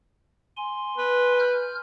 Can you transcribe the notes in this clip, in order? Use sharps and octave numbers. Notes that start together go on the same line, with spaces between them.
G#5 C6
B4
F6 G6